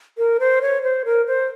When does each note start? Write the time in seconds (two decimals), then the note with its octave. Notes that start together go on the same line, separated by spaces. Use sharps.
0.18 A#4
0.40 C5
0.62 C#5
0.83 C5
1.05 A#4
1.27 C5